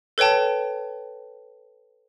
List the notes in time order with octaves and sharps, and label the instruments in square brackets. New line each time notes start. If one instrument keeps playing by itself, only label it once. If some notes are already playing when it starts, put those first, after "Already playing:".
[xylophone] A4 B4 C#5 G5 A5